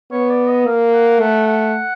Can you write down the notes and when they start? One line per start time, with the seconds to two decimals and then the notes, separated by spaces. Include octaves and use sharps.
0.11 B3 C#5
0.30 D5
0.48 D#5
0.66 A#3 F5
0.93 F#5
1.20 A3 F#5
1.47 F#5